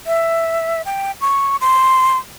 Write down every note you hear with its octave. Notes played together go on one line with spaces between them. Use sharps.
E5
G5
C#6
C6